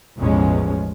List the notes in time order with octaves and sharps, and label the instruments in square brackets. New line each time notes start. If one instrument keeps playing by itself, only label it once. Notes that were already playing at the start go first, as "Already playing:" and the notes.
[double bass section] A1 E2 B2 F3 G#3 C#4